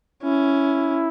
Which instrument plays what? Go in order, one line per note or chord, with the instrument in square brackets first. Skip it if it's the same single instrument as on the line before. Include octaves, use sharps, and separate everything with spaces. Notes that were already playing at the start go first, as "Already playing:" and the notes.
[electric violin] C#4 [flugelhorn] E4